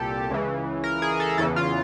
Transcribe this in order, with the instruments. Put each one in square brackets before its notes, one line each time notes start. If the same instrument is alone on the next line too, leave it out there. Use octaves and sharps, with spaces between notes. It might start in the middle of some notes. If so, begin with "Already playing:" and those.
Already playing: [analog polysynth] C2 A#2 G4 A4
C#2 C#3 E3
A#4
G#4
A4
E2 C#3 E3 A4
F4